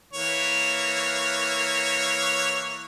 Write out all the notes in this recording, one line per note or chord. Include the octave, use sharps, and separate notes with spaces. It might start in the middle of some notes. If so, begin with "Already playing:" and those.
E3 A#3 C#5